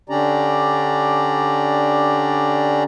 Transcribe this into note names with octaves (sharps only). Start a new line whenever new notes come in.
D3 C#4 D4 G4 D5 A#5